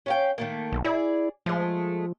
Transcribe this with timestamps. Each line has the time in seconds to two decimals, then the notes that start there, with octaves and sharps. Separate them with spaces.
0.06 C#4 F5 G5
0.38 D#3 A3 A#3
0.72 B1
0.85 E4 G#4 D5
1.46 F3 G#3 A3